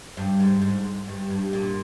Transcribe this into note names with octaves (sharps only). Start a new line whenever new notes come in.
G2
G#2
G#2
G2
G2
A#2